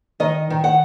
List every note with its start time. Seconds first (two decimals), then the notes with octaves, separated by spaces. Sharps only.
0.20 D#3 D#5
0.50 D#3
0.64 F#5